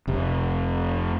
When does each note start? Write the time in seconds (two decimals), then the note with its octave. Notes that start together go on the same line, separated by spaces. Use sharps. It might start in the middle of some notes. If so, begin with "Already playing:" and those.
0.08 F1 C3